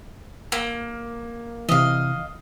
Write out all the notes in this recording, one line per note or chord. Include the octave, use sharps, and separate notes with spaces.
A#3
C3 E3 D#5 F5